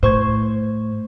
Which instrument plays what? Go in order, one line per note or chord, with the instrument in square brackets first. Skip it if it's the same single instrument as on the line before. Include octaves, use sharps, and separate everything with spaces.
[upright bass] A2 [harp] C5 C#6 G#6